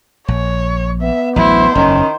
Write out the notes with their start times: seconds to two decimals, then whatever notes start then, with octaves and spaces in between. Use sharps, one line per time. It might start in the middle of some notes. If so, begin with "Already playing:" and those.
0.28 A#1 C#5
1.02 B3 E5
1.36 A1 D2 F#3 E4 C5
1.75 F#1 E2 D#3 C#4